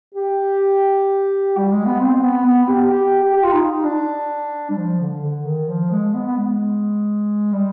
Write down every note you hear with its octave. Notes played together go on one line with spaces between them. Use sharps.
G4
G3
G#3
B3
C4
B3
B3
G4
G4
G4
G4
F4
D#4
D4
G3
F3
D3
D3
D#3
F3
G#3
B3
B3
G#3
G3